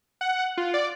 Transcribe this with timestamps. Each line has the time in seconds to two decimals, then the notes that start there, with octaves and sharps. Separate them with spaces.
0.21 F#5
0.58 F4
0.74 D5